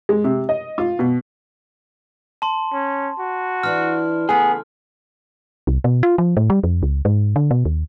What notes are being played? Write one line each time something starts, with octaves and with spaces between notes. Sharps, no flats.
G#3
C3
D#5
F4
B2
A5 C6
C#4
F#4
E3 D4 E4 F6
C#3 A3 B3 G#4
C2
B2
F4
F3
A2
G3
F2
C#2
G#2
D3
B2
D#2